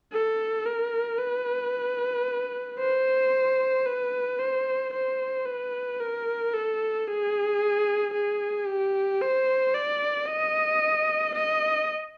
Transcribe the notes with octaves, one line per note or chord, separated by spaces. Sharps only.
A4
A#4
B4
C5
B4
C5
C5
B4
A#4
A4
G#4
G#4
G4
C5
D5
D#5
D#5